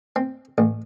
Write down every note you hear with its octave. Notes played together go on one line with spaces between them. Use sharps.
C4
A1